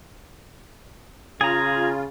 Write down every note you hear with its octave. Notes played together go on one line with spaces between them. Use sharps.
C#3 F4 G#4 A#5